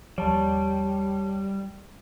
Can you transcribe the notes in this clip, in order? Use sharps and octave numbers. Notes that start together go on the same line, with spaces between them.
D#2 F3 G3 C#5 A5